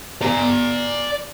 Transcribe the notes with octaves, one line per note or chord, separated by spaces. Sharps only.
D5 A#5